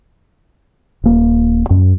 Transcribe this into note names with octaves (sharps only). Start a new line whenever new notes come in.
D#1 A#3
F#2